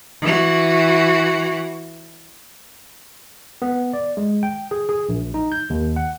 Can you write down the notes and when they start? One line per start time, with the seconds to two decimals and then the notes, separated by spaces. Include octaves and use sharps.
0.22 E3 F#4
3.62 B3
3.93 D5
4.17 G#3
4.43 G5
4.71 G#4
4.89 G#4
5.09 A#1
5.34 D#4
5.52 G6
5.70 D#2
5.96 F#5